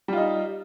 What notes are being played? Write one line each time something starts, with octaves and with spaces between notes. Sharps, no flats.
G3 D#4 F4